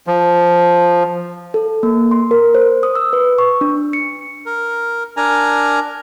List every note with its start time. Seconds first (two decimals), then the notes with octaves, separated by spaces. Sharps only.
0.07 F3
1.54 A4
1.83 A#3
2.11 C6
2.31 A#4
2.55 C5
2.83 D#6
2.95 E6
3.13 B4
3.38 C#6
3.61 D4
3.93 C#7
4.46 A#4
5.17 D4 A#4 G#5 A#5